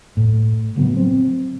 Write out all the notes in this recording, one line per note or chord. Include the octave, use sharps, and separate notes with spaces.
A2
C#3 F3 F#3 B3
C4